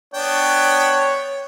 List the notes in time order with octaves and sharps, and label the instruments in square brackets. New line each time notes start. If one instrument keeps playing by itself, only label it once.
[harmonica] B3 D4 G5 [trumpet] C#5